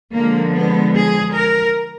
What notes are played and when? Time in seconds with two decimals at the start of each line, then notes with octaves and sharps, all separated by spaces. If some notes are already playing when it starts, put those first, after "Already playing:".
0.14 D3 F3 G#3 A#3
0.54 B3
0.95 G#4
1.35 A#4